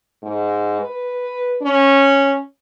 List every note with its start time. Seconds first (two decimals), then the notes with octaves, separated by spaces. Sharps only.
0.23 G#2
0.81 B4
1.62 C#4